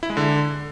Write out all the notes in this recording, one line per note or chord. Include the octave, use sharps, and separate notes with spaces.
E4
G#3
D3